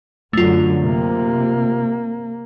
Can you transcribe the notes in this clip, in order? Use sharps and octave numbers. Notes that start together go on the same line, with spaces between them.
F#2 D3 F#3 A3 F4
C3 A#3